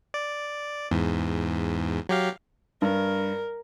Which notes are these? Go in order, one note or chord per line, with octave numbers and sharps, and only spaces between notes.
D5
E2 G#2
F#3 G4 F5
G2 A#4